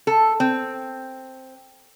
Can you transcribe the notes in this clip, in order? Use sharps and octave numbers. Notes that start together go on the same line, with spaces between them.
A4
C4